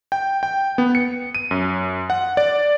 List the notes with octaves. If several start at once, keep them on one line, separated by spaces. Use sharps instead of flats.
G5
G5
B3
C#7
D#7
F#2
F#5
D5